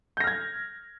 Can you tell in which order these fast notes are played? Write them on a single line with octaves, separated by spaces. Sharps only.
G6 A#6 F6 G#6